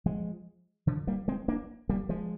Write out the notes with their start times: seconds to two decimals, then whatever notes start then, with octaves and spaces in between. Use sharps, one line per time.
0.06 F3 G#3
0.87 D3 F3
1.07 G3 A#3
1.28 G#3 C4
1.48 A#3 D4
1.89 G3 A#3
2.09 F3 G#3